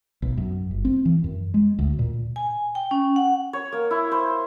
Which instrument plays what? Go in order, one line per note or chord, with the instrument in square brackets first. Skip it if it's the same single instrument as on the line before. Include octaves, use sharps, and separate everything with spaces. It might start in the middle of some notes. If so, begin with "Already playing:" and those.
[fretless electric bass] B1
F#2
G1
C4
E3
F#2
G#3
D2
A#2
[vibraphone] G#5
G5
C#4
F#5
[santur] C#5
A#3
E4
C5